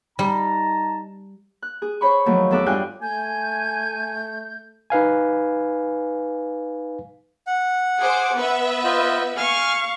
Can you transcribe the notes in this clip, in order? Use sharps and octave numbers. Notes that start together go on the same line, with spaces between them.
G3 D#4 A5 A#5
F#6
G#4
C5 C#5 B5 C#6
D#3 F3 F#3 A3
E2 G#4 A4 E5 D6 F#6
G2 F4 G5 G#5 F#6
A3 G#5 G6
D#4 B4 F5 G#5
F#5
G#4 C5 D6
B3 B4 E5
F4 C5 D#5
F5 G#5 C#6 F6